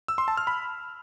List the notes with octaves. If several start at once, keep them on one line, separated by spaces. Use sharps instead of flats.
E6
C6
A5
F6
B5